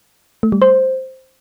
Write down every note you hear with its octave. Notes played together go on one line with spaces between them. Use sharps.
A3
G3
C5